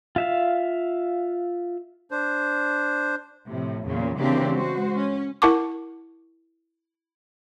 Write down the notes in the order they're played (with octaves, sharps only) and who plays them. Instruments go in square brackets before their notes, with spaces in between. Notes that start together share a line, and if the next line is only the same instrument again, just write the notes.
[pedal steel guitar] F4 E5 F5
[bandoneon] D4 C5
[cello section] A2 C3 F3
E2 A#2 C#3 F#3
C#3 E3 A#3 C4 D4 G4
G#3 F#4 C5
C#4
[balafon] E4 A#4 F#5 A5 C#6 D6